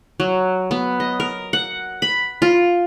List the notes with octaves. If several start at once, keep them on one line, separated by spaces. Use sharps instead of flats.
F#3
B3
D#5
A#4
F#5
B5
F4